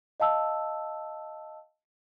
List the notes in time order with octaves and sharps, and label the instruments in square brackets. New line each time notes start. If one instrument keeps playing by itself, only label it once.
[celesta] D#5 F5 A5 E6